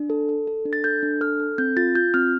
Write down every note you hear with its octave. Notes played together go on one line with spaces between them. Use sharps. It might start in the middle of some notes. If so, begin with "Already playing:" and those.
Already playing: D4
A4
A4
A4
D4
A6
A4 G6
D4
A4 F6
A4
C4 G6
F4 A6
F4 G6
C4 F6